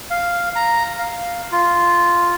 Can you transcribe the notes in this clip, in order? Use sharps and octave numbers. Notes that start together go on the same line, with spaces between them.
F5
A#5
F5
F4